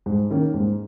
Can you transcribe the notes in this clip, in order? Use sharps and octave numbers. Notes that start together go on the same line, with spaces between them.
G#2
D#3 A#3 C#4
G#2